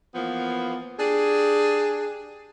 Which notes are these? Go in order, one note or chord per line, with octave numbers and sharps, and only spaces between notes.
E3 F3 A#3 B3
D4 G4 G#4